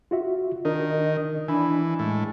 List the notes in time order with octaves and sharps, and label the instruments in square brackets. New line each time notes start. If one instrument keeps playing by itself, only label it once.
[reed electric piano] F4 F#4 E5
[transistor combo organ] D#3 [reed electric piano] D4 A#4 [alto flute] D#5
[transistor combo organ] E3 [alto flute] D4 [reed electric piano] G#5 B5
[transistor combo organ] A2 [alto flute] G#3